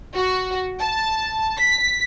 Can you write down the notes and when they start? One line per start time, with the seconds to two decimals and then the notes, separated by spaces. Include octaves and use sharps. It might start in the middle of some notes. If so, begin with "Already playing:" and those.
0.15 F#4
0.80 A5
1.58 B6